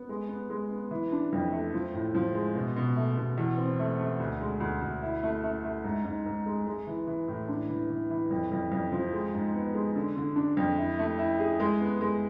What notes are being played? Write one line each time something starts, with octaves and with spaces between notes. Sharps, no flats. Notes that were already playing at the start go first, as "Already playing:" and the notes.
Already playing: B3
G#3
B3
G#3
B3
E3
D4
F2
A3
F3
A2
F3
G#3
B2
B2
A3
B2
E2
C4
A3
A3
D2
G#3
D2
D2
E4
A3
A3
A3
G#2
G#2
G#2
G#3
G#3
E3
E3
A2
D4
E3
E3
E3
F2
F2
F2
F3
G#3
G#2
B3
G#3
D3
D3
D4
F2
E4
A3
E4
G#4
G#3
B3
G#3